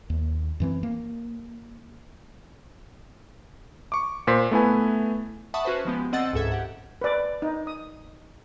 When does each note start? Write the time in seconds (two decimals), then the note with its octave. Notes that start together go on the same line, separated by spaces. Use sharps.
0.10 D#2
0.60 F#2 E3 C4
0.83 A#3
3.92 C#6 D6
4.27 A#2 C5 C6 B6
4.51 A3 B3 E4 B4 G#5
5.54 E5 F#5 A5 B5 C#6 D#6
5.65 C#4 F#4 B4 C5
5.85 F3 G#3 B3 G4
6.12 D3 C4 D#5 F#5 E6 A6
6.33 C#2 G#2 A4 E5 G#6
6.52 G4 F#5
7.01 B4 D5
7.42 D#4
7.67 D#6